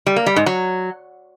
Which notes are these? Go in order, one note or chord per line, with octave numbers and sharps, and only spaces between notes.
G3
A#3
G3
G#2
F#3